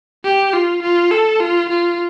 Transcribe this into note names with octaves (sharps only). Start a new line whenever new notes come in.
G4
F4
F4
A4
F4
F4